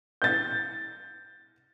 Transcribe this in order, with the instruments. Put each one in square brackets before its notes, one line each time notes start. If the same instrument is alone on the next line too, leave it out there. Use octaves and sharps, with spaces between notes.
[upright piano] G6 A6